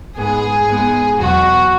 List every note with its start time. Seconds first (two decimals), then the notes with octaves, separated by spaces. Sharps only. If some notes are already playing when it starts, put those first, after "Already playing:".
0.17 G#2 G#3 B3 G#4
0.67 G#2 G#3 B3
1.18 E2 B2 F#3 F#4